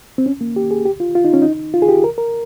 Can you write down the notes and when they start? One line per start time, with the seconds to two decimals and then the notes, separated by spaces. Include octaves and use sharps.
0.18 C4
0.26 C#4
0.41 A#3
0.56 G4
0.71 G#4
0.85 G4
1.00 F4
1.15 F4
1.25 D#4
1.34 C#4
1.42 D#4
1.74 F4
1.82 G#4
1.89 G4
2.04 A#4
2.18 A#4